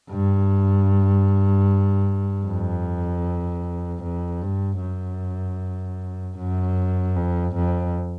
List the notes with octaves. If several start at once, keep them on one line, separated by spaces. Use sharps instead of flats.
G2
F2
F2
G2
F#2
F#2
F2
F2